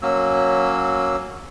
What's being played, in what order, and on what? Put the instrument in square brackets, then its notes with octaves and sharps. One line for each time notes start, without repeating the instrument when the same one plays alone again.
[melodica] F#3 A#3 C#4 E6